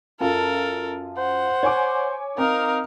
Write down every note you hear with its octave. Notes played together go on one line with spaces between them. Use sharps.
F#2 F4 A4 A#4 A5
C5 F#5
C#5 G#5 D6
C4 D#4 A#4 F5